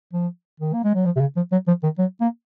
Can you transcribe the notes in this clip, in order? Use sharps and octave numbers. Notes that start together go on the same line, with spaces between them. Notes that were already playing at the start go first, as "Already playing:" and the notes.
F3
D#3
A#3
G#3
F#3
F3
C3
C#3
F3
F#3
F3
D#3
F#3
A#3